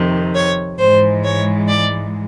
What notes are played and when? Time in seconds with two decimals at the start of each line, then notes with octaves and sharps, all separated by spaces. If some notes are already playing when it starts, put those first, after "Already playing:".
Already playing: F2 C3 D#3
0.35 C#5
0.79 G#2 E3 G#3 C5
1.23 C#5
1.68 D5